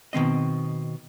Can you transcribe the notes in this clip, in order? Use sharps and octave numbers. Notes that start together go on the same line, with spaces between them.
B2 D#3 C4 D#5